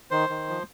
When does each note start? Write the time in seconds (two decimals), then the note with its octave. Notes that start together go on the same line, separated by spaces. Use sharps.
0.11 D#3 C5
0.30 D#3
0.49 F3